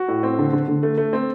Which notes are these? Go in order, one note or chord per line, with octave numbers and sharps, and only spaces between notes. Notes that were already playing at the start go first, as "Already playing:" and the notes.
Already playing: F#4
A2
C4
D3
D3
D3
A3
A3
C4